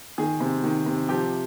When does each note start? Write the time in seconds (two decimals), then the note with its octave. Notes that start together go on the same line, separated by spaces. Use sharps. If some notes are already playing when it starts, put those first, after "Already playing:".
0.18 D#3 G#4
0.40 C3
0.64 D#3
0.86 C3
1.09 F3 G4